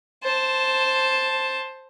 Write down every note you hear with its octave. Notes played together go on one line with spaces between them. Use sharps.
C5 A5